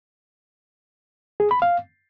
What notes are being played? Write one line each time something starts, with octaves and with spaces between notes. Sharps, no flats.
G#4
B5
F5